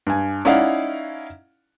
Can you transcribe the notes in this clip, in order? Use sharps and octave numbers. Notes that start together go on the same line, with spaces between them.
G2 G#5
C#4 D#4 E4 D5 F5 F#5